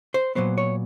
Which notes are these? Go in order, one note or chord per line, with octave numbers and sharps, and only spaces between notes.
C5
A#2 F#3 B3 C5
C#5